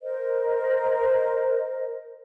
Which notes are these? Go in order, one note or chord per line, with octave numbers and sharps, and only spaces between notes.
A#4 C5 D#5